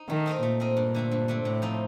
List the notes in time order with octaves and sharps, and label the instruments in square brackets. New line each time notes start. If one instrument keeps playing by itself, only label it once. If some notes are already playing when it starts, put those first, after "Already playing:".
Already playing: [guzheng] D#4
[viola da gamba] D#3 [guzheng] A3
[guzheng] C4 D#4 A#4 D#5
[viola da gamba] A#2 [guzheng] A3
[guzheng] C4 D#4 A#4 D#5
G2
D3 A3 C4
G2
D3 A3 C4
[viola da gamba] A2 [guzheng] C3
[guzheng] F3 C4 D#4